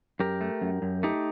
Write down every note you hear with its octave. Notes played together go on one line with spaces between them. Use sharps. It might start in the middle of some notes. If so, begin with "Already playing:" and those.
F#2 G4 A#4
A3
F#2
F#2
A3 D#4 G4